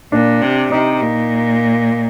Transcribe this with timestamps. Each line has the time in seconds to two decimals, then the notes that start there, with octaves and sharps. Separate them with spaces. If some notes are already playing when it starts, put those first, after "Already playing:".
0.12 A#2 D4
0.42 C3
0.71 C3 D#4
1.01 A#2